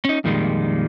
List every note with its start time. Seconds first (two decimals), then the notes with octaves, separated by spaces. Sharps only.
0.05 C#4 D#4
0.24 F2 A#2 D#3 G3 G#3